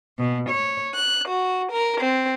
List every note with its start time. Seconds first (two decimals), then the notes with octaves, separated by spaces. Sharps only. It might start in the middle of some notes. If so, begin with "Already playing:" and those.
0.19 B2
0.50 C#5
0.94 F#6
1.28 F#4
1.71 A#4
2.00 C4